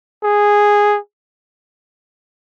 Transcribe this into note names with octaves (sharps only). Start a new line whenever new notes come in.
G#4